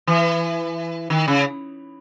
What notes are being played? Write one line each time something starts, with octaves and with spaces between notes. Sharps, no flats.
E3
D#3
C#3